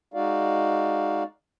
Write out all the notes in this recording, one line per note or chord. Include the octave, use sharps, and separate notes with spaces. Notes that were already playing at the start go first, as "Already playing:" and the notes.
G#3 D#4 F#4 D5 F5